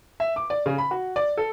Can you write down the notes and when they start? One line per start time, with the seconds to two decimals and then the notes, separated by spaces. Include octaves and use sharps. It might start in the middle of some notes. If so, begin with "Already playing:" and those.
0.20 E5
0.36 D6
0.50 D5
0.66 C#3
0.78 B5
0.91 F#4
1.16 D5
1.37 A4